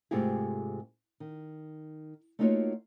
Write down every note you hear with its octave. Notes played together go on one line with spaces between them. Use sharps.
G#2 C3 A3 F4 G4 G#4
D#3
A3 A#3 D#4 F4 F#4 C#5